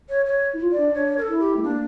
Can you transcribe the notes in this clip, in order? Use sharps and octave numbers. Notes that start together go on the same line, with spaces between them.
C#5
C#5
E4
F4
D5
D4
D4 C#5
A#4
A4
E4
G4
A3
A#3 D4